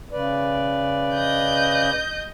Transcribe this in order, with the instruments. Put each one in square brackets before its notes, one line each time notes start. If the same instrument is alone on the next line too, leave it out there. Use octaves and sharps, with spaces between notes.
[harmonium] C#3 B4 D5
[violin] D#5 G6